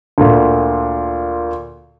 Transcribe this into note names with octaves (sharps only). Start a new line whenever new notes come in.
D2 A#2